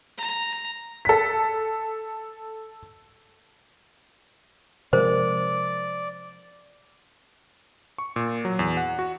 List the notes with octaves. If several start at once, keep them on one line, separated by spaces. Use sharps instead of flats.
A#5
A4 B6
C3 F3 G#3 A#4 C5 D5
C#6
A#2
F#3
E2
F#5
F#4